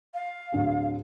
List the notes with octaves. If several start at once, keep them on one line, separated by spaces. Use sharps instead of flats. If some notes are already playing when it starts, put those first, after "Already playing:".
F5
D1 D3 G#4